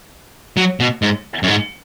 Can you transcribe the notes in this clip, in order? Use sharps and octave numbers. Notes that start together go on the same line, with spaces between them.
F#3
B2
G#2
F#2
G#2